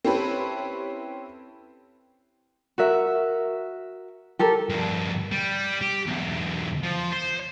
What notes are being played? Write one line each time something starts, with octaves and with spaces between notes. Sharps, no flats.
C4 C#4 E4 G4 A4 B4
F#4 A#4 E5
G4 A4 A#4
G2 F3
G3
G4
B1 E2
F3
C5